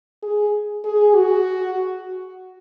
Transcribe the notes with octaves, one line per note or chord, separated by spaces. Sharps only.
G#4
G#4
F#4